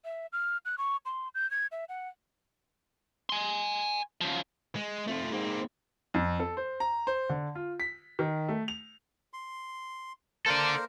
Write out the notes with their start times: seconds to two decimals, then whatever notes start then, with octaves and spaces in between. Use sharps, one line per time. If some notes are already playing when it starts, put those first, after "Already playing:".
0.05 E5
0.33 F6
0.65 F#6
0.78 C#6
1.06 C6
1.35 G6
1.51 G#6
1.72 E5
1.89 F#5
3.29 G#5 C6
4.21 C#3 F3
4.75 G#3
5.07 F2 A3 F4
5.32 G#2 A#3 C4
6.14 F2
6.40 A4
6.57 C5
6.80 A#5
7.07 C5
7.29 D3
7.55 F4
7.80 B6
8.19 D#3
8.48 A3
8.68 F7
9.33 C6
10.46 A#3 A4 A#4 C5 D5